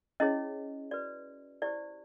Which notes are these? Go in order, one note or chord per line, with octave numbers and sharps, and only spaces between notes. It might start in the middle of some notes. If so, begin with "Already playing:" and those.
C#4 E4 G#4 C#5 D#5
F#4 B4 D5
E4 G4 C5 D5